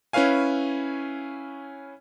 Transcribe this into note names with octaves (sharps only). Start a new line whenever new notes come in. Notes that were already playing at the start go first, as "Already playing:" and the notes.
C#4 E4 B4 C#5 F5 G#5